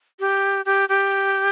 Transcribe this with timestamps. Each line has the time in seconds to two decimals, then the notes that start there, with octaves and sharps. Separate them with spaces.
0.20 G4
0.65 G4
0.89 G4